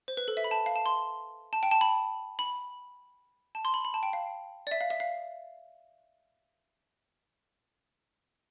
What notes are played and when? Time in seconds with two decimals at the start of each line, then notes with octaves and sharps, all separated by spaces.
0.08 C5
0.17 B4
0.28 A4
0.37 E5
0.44 B5
0.51 A5
0.66 F5
0.76 A5
0.86 C6
1.53 A5
1.63 G5
1.71 A5
1.81 B5
2.39 B5
3.55 A5
3.65 C6
3.74 B5
3.85 B5
3.94 A5
4.03 G5
4.13 F5
4.67 D5
4.71 E5
4.81 F5
4.91 E5
5.00 F5